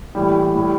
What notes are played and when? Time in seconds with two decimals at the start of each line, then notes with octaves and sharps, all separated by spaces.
0.15 A2 E3 G3
0.55 A2 G3